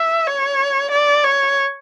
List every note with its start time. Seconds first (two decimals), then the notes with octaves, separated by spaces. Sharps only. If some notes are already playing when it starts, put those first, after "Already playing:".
Already playing: E5
0.27 C#5
0.91 D5
1.23 C#5